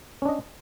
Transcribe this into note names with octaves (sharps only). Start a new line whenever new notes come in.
C#4 D4 D#5